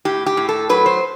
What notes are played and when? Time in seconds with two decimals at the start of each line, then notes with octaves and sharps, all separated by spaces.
0.05 A2 G4
0.26 G4
0.37 A2
0.49 A4
0.69 F#3 B4
0.86 C5